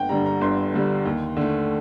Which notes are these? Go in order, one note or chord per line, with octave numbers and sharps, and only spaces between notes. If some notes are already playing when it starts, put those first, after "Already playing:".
Already playing: G1 F#5 G5
G2 D3 G3 A#5
A#5
G1 C6
G2 D3 G3
D#2
D3 A3